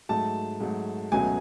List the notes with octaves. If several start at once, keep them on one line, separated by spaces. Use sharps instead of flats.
G#2 F#3 A3 A5
G#2 F#3 A3
C#2 B2 F#3 A3 G#5